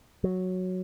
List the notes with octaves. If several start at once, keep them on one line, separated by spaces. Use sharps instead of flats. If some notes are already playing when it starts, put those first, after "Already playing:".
F#3